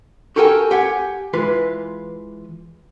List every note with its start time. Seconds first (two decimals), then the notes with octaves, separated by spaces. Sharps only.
0.36 F#4 G4 A4 A#4 G5 G#5
0.71 G4 F#5 G#5
1.33 E3 G#3 F4 B4